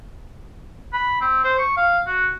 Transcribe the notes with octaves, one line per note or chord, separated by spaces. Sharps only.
B5
C4
C5
C#6
F5
F#4